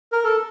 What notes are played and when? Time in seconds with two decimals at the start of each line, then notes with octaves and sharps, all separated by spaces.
0.12 A#4
0.24 A4